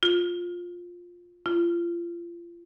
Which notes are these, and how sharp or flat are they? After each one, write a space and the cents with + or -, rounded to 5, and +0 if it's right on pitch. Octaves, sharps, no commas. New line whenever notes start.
F4 +10
F4 -30